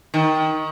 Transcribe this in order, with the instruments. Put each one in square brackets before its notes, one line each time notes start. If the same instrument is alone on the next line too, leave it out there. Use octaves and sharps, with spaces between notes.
[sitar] D#3